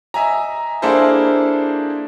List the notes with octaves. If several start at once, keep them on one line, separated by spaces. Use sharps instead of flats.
D#5 E5 G#5 A#5
A#3 D4 E4 G#4 A4 C5